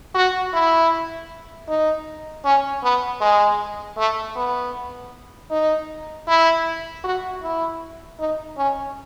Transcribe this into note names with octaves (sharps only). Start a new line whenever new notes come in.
F#4
E4
D#4
C#4
B3
G#3
A3
B3
D#4
E4
F#4
E4
D#4
C#4